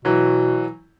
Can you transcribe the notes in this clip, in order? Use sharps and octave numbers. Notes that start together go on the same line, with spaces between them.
B2 E3 F#3